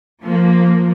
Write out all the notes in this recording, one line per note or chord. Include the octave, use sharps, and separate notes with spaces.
F3 A#3